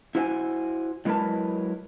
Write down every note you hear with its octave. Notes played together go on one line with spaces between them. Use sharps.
E4 F#4 C5 E5 F5 G#5
F#3 G#3 E4 A#4 B4 A5